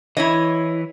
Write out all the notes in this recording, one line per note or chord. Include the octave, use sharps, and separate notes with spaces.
E3 E4 C#5 D#5